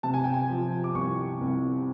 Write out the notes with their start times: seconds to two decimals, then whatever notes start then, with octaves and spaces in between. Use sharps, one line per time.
0.03 C3 A5
0.14 G#5
0.24 G5
0.34 G#5
0.49 F3
0.84 D6
0.95 C2 C#6
1.41 C2